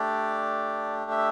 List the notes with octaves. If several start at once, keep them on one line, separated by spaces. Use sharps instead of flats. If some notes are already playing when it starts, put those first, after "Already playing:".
Already playing: A3 D4 G4 D5
E5